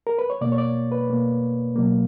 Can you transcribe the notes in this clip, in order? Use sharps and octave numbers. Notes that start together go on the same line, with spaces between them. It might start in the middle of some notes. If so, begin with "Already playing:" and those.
A#4
B4
C#5
B2 A#3 D5
C#5
D5
B4
B2 A#3
B2 F#3 A#3